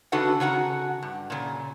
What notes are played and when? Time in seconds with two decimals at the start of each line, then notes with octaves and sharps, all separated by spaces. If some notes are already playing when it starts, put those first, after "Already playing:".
0.12 C#3 D4 F#4 A4 B4 F#5
0.40 C#3 F#4 F#5 A#5
1.02 G2
1.30 A#2 C#3